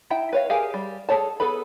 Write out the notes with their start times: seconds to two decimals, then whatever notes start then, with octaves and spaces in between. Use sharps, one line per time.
0.10 D#4 E4 E5 G5
0.33 B4 C#5 F5
0.50 G4 G#4 A#4 F5 G#5
0.74 G3
1.09 G#4 A4 C#5 A5
1.40 B3 G#4 A4 B4 B5